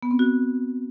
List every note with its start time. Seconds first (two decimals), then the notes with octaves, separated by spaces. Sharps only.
0.03 B3
0.11 C4
0.19 F#4